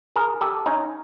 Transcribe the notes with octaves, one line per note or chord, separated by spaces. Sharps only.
G#4 A#4
G4 A4
C#4 D#4